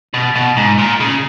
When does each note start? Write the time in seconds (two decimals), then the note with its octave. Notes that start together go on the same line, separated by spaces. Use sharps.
0.14 B2
0.35 B2
0.57 G#2
0.78 A#2
1.00 C#3